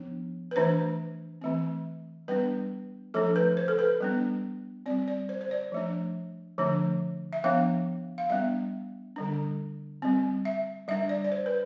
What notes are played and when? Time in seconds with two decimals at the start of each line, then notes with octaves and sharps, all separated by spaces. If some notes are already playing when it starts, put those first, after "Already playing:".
Already playing: F3 B3 D4
0.51 B4
0.56 E3 A3 D4 C5
1.41 E3 A3 C4
2.28 G3 B3 D4 B4
3.14 F3 A3 D4 A4
3.36 B4
3.57 C5
3.68 A4
3.79 B4
4.00 G3 B3 D4
4.86 C4 D5
4.90 G3
5.08 D5
5.29 C5
5.41 C5
5.51 D5
5.72 F3 A3 D4
6.58 D3 F3 A3 D4
7.33 E5
7.44 F3 B3 D4 F5
8.18 F5
8.30 G3 B3 D4 E5
9.16 D3 G3 D4
10.02 G3 C4
10.45 E5
10.88 G3 D4 E5
11.09 D5
11.25 D5
11.32 C5
11.46 B4